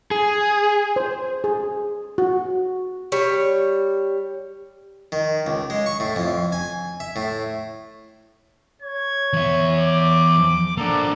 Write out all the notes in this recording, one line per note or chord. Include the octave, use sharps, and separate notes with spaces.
G#4
C5
G#4
F#4
G3 C#5
D#3
C#2
G#3
C#6
A2
F2
G#5
E5
A2
C#5 G#6
E2 E5
D6
A#3 D4 A4 F#5 A#5 D6